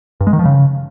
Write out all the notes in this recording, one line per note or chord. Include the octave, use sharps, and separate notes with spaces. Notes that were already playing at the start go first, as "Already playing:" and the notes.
G2
G#3
D#3
F3
C#3